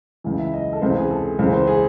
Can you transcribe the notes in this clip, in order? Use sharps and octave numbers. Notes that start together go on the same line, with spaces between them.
C#2 C#3 E3
E5
D#5
A4
C#2 C3 E3 C5
G#4
A4
C#2 C#3 E3 C5
C5
G#4